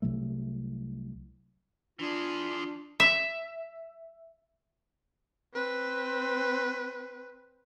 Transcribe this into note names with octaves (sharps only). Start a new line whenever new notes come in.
C2 C3 F#3 A3
E3 D4 F4 G#4
E5
C4 B4